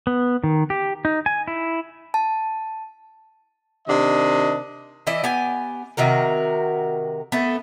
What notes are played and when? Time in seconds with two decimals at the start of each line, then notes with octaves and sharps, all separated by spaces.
0.07 B3
0.44 D#3
0.70 G4
1.05 D#4
1.26 G#5
1.48 E4
2.14 A5
3.87 C3 D#3 D4 D#5
5.07 E3 E4 D5 D#5
5.24 B3 G4 G#5
5.97 C3 D#3 F#4 A#4
7.32 A3 B3